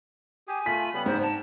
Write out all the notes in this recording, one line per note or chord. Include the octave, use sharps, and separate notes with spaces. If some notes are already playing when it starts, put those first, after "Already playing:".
G4 G#4 G#5
A3 F4 B5 B6
C#3 G3 B3 B5
G#2 C5
A5